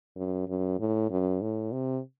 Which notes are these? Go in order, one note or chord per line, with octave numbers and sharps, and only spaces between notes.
F#2
F#2
A2
F#2
A2
C3